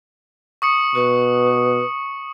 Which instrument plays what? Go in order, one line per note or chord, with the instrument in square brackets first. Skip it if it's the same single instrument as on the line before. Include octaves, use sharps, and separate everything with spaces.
[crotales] C#6 D#6 C#7
[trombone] B2 [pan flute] B4